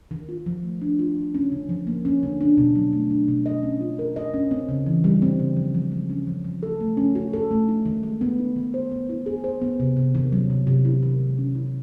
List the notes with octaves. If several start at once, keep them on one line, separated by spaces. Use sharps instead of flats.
D#3
F4
F3
A3
D4
F4
F3
C#4
D3
F3
A#3
C#4
D3
D4
B2
F#3
A3
D4
B2
D#5
C#4
F4
A#4
D#5
C#4
C4
C#3
E3
G3
C4
C#3
F3
F3
G#3
C#4
F3
F3
A4
A3
C#4
F#4
A4
A3
D#4
D#3
G#3
B3
D#4
D#3
C5
B3
E4
G#4
C5
B3
C3
C3
D#3
F#3
C3
C3
E4
D#3
G#3
C#4
E4